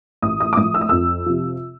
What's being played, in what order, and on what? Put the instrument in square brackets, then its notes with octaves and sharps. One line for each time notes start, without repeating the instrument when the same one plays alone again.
[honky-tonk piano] A1 D#6
D#6
D6
A2 F3 D#6
E6
D#6
F2 E6
C3 F3